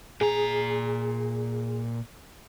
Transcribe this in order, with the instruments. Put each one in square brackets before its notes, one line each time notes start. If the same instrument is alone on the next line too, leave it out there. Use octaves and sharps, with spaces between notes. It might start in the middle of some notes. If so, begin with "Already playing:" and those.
[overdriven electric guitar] A#2 A#5 [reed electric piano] G#4